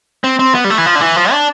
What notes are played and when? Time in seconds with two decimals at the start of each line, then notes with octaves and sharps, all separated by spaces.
0.24 C4
0.39 C4
0.55 B3
0.64 G3
0.70 A3
0.78 E3
0.86 F3
0.95 D3
1.01 E3
1.16 F3
1.32 D4